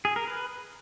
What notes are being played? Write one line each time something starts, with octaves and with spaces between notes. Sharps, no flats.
G#4
A#4
B4